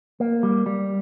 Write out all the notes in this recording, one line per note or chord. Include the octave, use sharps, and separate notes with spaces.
A#3
G3
G3